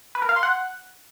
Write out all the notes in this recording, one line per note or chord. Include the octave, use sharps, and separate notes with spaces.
B4
A#4
F5
C6
F#5